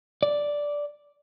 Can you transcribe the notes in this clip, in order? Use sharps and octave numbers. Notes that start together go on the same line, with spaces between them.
D5